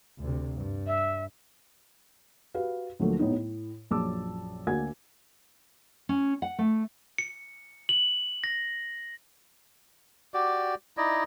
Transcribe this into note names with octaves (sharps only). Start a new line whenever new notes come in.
D2 C3
G2
E5
F#4 G4 B4 F5
D2 F3 F#3 A3 A#3
A2 B3 D#4
A2
A#1 F#2 A5 D6 E6
D2 A#3 F#4 F#5 G#5 G#6
C#4
F#5
A3
C#7
F#7
A#6
F#4 G4 D5
D#4 E4 D5 D#5